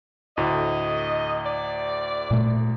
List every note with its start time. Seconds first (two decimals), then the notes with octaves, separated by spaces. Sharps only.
0.37 D2 A2 D#5
1.46 D5
2.31 A#2 A3